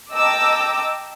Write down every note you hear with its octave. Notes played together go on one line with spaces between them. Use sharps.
D#5 G5 A5 A#5 D6 E6